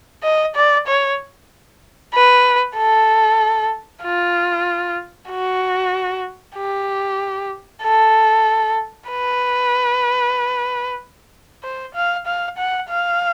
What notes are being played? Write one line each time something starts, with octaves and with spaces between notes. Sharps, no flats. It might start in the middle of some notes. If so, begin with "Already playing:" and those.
D#5
D5
C#5
B4
A4
F4
F#4
G4
A4
B4
C5
F5
F5
F#5
F5